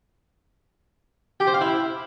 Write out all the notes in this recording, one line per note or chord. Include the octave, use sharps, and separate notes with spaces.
G4
C5
F5
E4